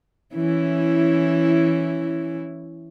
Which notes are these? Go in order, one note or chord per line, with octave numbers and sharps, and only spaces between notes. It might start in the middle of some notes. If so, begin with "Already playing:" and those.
E3 C#4 E4